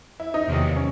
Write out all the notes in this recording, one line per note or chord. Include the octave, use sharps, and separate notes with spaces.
E4
D#4
E2 C3 D#3 F#3 A#3
C#4